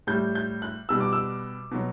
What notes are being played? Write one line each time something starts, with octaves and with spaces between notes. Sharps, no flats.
A2 G3 G6
G6
F#6
B2 G3 E6
D6
E6
B2 F#3